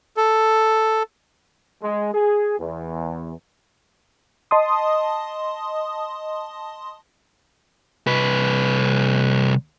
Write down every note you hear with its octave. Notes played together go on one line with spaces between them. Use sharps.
A4
G#3
G#4
E2
D#5 A5 C6 D#6
C2 B4